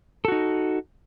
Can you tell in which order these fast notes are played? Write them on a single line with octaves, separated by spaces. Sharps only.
A4 F#4 D#4